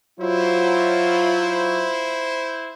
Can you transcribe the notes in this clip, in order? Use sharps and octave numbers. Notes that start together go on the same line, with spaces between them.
F#3 E4 F4 C5